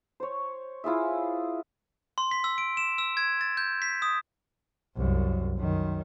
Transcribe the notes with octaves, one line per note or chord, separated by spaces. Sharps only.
C5 C#5
E4 F4 G#4 E5
C6
B6
E6
D7
E7
E6
G#6
A6
G6
B6
D#6
C2 F#2
F#2 D#3